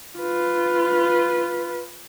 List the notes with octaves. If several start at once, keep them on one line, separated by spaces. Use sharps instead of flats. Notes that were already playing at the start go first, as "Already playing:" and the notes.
F4 B4